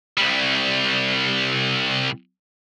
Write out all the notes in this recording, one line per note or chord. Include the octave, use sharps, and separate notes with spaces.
C2 G3